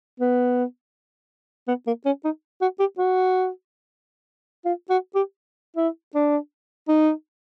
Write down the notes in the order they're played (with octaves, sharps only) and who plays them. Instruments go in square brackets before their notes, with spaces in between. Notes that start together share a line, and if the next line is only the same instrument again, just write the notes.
[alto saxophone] B3
B3
A#3
C#4
D#4
F#4
G4
F#4
F4
F#4
G4
E4
D4
D#4